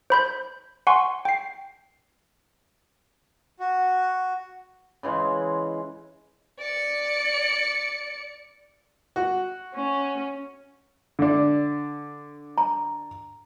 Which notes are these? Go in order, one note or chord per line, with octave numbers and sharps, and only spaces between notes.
C5 B5 G6
F#5 G#5 C6 C#6
G5 C7
F#4
C#3 E3 G#3
D5 C#7
F#4
C#4
D3 D4
A#5